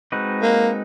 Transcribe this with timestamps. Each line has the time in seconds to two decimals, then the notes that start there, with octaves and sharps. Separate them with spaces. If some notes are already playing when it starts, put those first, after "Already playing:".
0.12 G#3 C4 D#4 F#4 B4
0.42 A#3